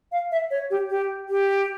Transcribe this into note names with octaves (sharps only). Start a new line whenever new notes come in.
F5
E5
C#5
G4
G4
G4